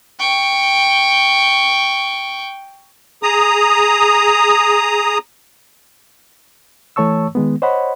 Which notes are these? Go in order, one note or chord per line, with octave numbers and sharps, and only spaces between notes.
G5 C#6
G#4 A#5 D#6
E3 A3 C#5 A5 C#6 E6
D#3 G#3 B3
C5 C#5 D#5 F#5 B5